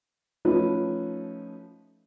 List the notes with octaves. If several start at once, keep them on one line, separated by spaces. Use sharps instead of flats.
F3 A3 C#4 D#4 B4